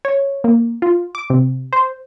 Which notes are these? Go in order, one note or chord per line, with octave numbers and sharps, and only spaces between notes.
C#5
A#3
F4
D6
C3
C5